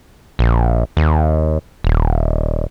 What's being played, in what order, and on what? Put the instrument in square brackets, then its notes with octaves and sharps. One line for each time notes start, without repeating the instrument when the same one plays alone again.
[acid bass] A#1
D#2
D#1